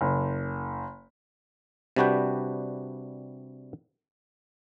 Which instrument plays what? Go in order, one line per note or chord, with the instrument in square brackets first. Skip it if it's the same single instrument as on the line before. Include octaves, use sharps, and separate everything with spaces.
[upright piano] F#1
[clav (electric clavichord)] C3 G3 D4 F#4 B4 G5